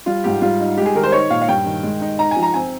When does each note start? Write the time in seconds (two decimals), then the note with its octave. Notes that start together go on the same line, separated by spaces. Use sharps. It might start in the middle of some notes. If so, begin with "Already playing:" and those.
0.06 G3 F4
0.24 G#2 G4
0.42 G3 F4
0.60 D#4
0.77 G#3 G4
0.86 G#4
0.95 D#3 A#4
1.03 C5
1.12 D#4 C#5
1.30 A#2 F5
1.41 F5
1.48 G2 G5
1.66 D#3
1.83 G#3
2.01 D#4
2.18 D#4 A#5
2.31 G#5
2.36 F3
2.43 A#5
2.54 C4 G#5